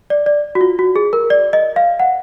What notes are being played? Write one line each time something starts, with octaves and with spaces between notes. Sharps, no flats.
D5
D5
F#4
F4
F#4
G#4
A#4
D5
D#5
F5
F#5